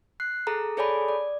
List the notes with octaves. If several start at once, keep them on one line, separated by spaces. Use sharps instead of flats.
F#6 C7
G#4 A4 A#5
G#4 A4 C#5 D5 G#5 B5
D5